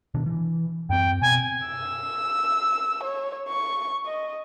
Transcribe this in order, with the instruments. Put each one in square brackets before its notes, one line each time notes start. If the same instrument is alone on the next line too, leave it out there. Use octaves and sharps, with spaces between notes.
[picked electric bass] B2 D#3 D4
E3
[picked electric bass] F#2 C4 [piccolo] G5
[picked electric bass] B2 [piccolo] G#5
[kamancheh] E6
C#5
C#6
D#5